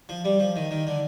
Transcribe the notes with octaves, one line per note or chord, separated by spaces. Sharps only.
F3
G3
F3
D#3
D#3
D3